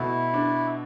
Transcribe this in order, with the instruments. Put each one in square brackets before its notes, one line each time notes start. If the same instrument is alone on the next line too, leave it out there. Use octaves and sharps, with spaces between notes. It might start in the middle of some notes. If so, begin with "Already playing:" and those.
Already playing: [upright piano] B2 A3 [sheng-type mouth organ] E4
[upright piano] D4